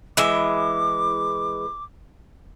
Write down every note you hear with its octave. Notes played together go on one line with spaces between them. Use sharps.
E3 G#3 E5 D6